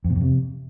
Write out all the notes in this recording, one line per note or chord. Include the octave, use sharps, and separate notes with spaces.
F2
B2
F2
C3